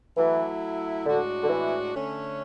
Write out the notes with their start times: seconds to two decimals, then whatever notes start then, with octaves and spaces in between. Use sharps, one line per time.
0.17 E3 F#3 A3 E4
1.06 A2 D3 G#3 D4 F#4
1.43 D3
1.49 E3
1.94 D3 A3 C#4